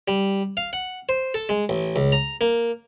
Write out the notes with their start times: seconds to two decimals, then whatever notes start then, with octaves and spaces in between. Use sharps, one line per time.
0.08 G3
0.57 F5
0.73 F#5
1.09 C5
1.34 A4
1.49 G#3
1.69 A1
1.96 C#2
2.12 A#5
2.41 A#3